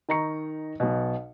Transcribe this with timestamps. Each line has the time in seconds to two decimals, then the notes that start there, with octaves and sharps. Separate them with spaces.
0.09 D#3 D#4 A#5 C#6 C#7
0.80 B1 B2